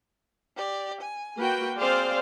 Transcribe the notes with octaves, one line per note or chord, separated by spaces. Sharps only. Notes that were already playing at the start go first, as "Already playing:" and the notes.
G4 D5
G#5
A#3 F#4 B4 G5
C4 G#4 C5 D5 F5